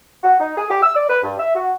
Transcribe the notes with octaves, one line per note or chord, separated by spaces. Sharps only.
F#4
D#4
G#4
G4
E6
D5
B4
G2
E5
F#4